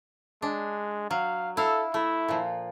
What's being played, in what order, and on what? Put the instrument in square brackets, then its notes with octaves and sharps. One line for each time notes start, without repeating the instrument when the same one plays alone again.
[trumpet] G#3 [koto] D4
[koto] F#3 [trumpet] F5
[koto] E4 F5 [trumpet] A4
[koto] A3 [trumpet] E4
[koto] A#2 F3